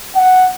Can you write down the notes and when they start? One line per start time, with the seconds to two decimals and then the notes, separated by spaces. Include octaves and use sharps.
0.16 F#5